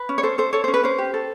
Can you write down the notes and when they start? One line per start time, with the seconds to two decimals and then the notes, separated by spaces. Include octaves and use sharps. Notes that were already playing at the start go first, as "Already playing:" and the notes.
Already playing: B4
0.09 C#4
0.18 C#5
0.23 A4 C5
0.38 A4 C5
0.53 A4 C#5
0.64 C#4 C5
0.74 B4
0.83 C#4 C5
0.98 G4
1.14 A4